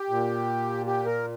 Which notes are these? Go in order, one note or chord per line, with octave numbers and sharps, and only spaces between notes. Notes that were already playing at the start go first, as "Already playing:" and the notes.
Already playing: G4
A#2
G4
A#4